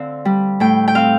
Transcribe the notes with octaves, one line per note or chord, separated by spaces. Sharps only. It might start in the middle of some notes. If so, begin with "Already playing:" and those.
Already playing: D3 C4 F5
G3
A2 G5
G5
C4 F5